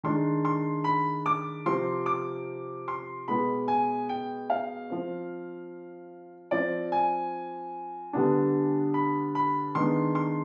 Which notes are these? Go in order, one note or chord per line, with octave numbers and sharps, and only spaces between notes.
D#3 G#3 D4 C6
C6
B5
D6
C3 F3 C4 C6
D6
C6
B2 G#3 B3 B5
G#5
G5
F5
F3 C4
F3 C4 D5
G#5
D3 G3 B3 D4
B5
B5
D#3 G#3 B3 D4 C6
C6